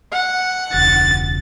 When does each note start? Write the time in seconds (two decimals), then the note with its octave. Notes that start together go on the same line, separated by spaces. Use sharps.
0.12 F#5
0.74 E1 C#2 A6